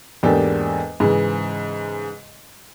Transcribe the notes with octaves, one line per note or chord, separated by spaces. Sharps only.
E2 G#2 A#3 D4 G4 A4
G#2 C#3 E3